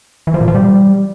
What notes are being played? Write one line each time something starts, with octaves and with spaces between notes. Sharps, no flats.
E3
F3
A#2
F3
G3